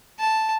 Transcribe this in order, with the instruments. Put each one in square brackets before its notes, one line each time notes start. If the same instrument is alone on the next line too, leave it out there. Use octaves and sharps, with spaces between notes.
[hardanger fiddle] A5